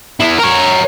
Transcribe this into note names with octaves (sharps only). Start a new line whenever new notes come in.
B3 E4
A#4 C#5